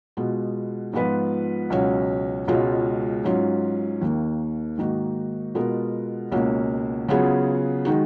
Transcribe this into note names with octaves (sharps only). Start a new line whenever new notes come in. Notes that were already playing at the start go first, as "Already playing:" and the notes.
B2 G#3 B3 F4
G#2 F3 B3 F4 B4
C#2 B2 F#3 C#4
C#2 B2 G#3 C#4 F4
G#2 F#3 C#4 F4
D#2 D#3 A#3
G#2 D#3 A#3 D#4 F#4
B2 G#3 B3 F4 A#4
C#2 B2 A#3 C#4 F#4
C#3 F#3 B3 F4 G#4
D#3 G#3 D#4 F#4